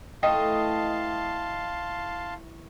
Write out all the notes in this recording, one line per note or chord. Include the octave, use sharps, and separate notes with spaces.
E3 A3 D#5 F5 G5 A5 C6